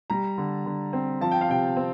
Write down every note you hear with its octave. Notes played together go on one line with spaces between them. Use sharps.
G3 A#5
D3
D3
C4
F3 A5
G5
F5
C3 G5
C4